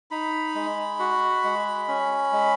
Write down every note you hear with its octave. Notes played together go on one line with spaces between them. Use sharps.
D#4 B5
G#3
F#4
G#3
C#4
G#3